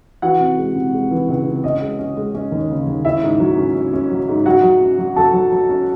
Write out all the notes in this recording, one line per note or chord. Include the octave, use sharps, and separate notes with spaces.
E3 F#4 F#5
C3
G#3
C3
G#3
E3
C#2
C3
C#4 D#5
G#3
C#4
G#3
C#4
D#2
C#3
D#2
C#4 E4 E5
G#2
F#3
C#4
C#4
C#4
F#3
G#2
F#3 F#4 F#5
F#3
C#4
F#3
F#3 A4 A5
F#3
F#3
C#4